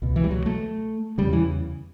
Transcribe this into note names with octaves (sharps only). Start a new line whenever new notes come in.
C#2 B2
E3
G3
F#3
A3
E2 C#3 G3
E3